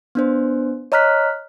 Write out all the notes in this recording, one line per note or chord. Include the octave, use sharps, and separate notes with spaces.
B3 D4 C5
C#5 D#5 A#5 F6 F#6 B6